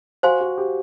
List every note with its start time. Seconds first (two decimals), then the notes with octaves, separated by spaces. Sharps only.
0.23 F#4 C5 F5 G#5 C6
0.40 F#4
0.58 G4